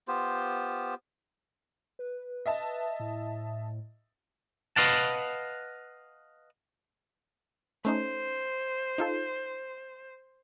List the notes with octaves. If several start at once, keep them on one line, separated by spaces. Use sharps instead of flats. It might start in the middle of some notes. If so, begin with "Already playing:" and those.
B3 F4 G4 C5
B4
D#5 E5 A5
A2
B4 D#5 F5 F#5 A5
A3 C#4 D#4 C5
D#4 F4 A4